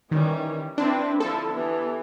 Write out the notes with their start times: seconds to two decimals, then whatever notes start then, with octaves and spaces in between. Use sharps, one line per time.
0.11 D#3 E3 G3 C#4
0.78 C4 D4 E4 B4
1.20 D3 F3 E4 A4
1.51 E3 B3 G4